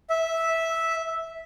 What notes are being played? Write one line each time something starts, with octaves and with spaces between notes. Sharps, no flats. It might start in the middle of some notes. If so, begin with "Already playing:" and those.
E5